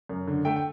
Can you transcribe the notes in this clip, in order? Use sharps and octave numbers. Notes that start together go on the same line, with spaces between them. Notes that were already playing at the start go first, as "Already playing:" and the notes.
F#2
D3
A3 G5
G5